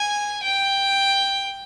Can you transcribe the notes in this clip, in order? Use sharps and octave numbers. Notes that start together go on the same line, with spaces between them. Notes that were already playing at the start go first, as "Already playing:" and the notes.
Already playing: G#5
G5